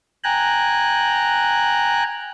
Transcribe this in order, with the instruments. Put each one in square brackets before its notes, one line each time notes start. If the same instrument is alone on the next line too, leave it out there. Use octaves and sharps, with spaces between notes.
[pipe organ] G5 G#5 A#5 F#6